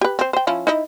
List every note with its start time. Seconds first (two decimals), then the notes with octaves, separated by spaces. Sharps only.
0.01 G4 B4
0.19 C4 C5
0.33 C5 G5
0.47 F3 C#4 E4
0.67 D#4 E4 D#5